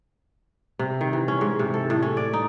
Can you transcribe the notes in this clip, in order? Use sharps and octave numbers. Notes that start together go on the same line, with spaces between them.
C3
D#3
E3
C#4
G#2
C3
A4
A2
C#4
D5
D#4